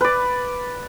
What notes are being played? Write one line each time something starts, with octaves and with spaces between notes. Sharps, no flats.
B4 D5